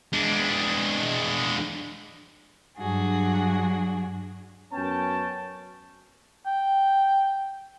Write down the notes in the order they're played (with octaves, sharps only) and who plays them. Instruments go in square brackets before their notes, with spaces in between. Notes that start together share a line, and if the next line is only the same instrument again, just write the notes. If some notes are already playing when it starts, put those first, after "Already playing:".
[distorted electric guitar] G#3 D4
[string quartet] G2 F#3 D4 F#4 G#4
[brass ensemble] F#2 B3 C#4 G5 A5
[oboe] G5